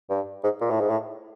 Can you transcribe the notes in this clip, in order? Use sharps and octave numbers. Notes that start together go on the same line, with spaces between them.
G2
G#2
A#2
A2
G#2
A2